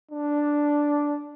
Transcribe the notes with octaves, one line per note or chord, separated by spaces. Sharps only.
D4